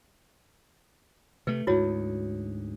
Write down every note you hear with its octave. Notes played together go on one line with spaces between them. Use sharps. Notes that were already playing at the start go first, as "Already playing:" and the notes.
C3 A3 B4
D2 G#2 E4 F#4 C#5